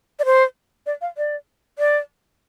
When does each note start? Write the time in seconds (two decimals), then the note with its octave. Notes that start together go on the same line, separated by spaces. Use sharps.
0.19 D5
0.25 C5
0.86 D5
1.01 F5
1.17 D5
1.79 D5